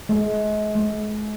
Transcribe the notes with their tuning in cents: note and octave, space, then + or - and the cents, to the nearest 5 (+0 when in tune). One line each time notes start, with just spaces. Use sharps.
G#3 +35
G#3 +40